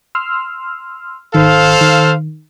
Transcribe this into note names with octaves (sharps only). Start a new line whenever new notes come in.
C6 E6 F6
G#1 D#3 A4 C5 F5
D#3